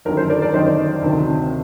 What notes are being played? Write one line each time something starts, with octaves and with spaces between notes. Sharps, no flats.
G1 F#2 D#3 A#4
A4 C5
A#4 D5
A#4 D5
G1 F#2 D#3 C5 D#5
D2 C3 D#3